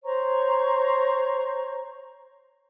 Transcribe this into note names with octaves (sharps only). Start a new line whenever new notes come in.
C5 C#5 A#5 C#6